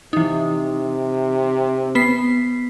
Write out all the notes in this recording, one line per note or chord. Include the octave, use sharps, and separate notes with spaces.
C3 E3 D#4
B3 B6 C7